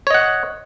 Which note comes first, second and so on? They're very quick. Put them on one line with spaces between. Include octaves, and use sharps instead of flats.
C#5 D#5 F#5